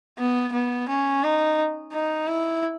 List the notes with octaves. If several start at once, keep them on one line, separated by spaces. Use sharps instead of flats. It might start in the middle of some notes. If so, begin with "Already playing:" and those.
B3
B3
C#4
D#4
D#4
E4